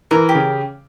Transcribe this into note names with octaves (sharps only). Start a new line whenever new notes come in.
E3 A#4
G4
C#3